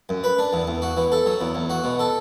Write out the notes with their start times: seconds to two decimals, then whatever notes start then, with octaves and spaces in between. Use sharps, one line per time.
0.09 F#2
0.24 B4
0.38 D4
0.53 E2
0.68 E2
0.82 F#4
0.97 E3
1.12 A4
1.26 F#3
1.41 E2
1.55 E2
1.70 F#4
1.84 B2
1.99 A4